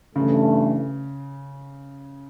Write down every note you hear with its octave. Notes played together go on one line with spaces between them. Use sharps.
G2 C#3 E3 A3